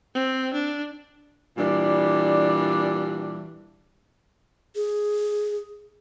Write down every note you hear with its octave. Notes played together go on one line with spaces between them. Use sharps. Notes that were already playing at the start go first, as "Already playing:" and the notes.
C4
D4
A#2 E3 G3 D4
G#4